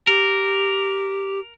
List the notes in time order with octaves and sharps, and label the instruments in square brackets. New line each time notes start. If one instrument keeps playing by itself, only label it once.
[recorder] G4 [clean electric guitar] A#4